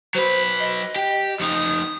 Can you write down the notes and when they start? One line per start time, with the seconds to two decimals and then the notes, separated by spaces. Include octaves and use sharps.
0.15 F#3 B4 C5
0.60 D#5
0.96 G4
1.40 F2 D#4 D#6